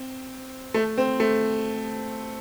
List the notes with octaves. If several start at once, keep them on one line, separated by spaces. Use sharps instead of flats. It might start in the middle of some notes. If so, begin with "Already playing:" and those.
Already playing: C4
A3
C4
A3